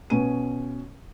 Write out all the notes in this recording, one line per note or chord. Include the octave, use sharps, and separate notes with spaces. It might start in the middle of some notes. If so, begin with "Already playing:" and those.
B2 C#4 D#7